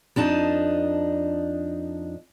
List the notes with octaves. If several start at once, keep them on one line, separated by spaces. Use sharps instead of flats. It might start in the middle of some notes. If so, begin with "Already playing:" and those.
F2 D4 D#4 A5